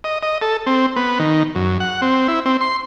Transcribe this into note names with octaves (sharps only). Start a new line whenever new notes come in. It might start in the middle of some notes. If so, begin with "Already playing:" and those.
D#5
D#5
A4
C4
B3
D#3
F#2
F#5
C4
E4
C4
C6